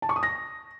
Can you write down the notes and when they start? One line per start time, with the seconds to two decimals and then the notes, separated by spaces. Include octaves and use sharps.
0.02 A5
0.09 C#6
0.16 D#6
0.23 A#6